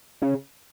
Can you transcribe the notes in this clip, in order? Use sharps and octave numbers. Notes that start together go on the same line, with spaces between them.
C#3